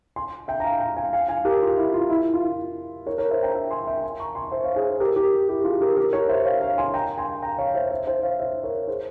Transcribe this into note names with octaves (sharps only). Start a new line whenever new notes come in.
G#5 C6
E5 G5
A#5
F5 G#5
G5 A#5
F5 G#5
F5 G#5
F5 G#5
G4 A#4
F4
E4
F4
E4
F4
A#4 C#5
A#4 C#5
C5 E5
G5 A#5
E5 G5
G#5 C6
E5 G5
G#5 C6
A#5 C#6
G#5 C6
C5 E5
C#5 F5
G#4 C5
G4 A#4
G4 A#4
E4 G4
F4 G#4
G4 A#4
G4 A#4
A#4 C#5
C5 E5
C#5 F5
C#5 F5
G#5 C6
G5 A#5
G#5 C6
G5 A#5
C#5 F5
C5 E5
C5 E5
C5 E5
C#5 F5
C5 E5
A#4 C#5
G#4 C5